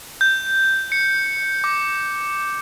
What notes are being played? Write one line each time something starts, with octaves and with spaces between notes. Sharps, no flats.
G6
C#7
D6